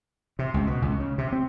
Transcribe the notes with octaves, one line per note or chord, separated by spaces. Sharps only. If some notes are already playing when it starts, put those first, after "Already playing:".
C3
C#2
B2
C#2
C#3
C3
C4